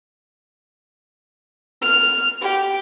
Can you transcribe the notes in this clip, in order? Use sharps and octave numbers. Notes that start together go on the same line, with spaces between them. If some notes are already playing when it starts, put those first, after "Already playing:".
F6
G4